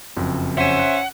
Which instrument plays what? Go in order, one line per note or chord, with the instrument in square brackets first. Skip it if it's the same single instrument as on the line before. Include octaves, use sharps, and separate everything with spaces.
[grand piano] F#1 F2
[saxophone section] C#4 C5 E5 [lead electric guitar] F#5
[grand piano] F#6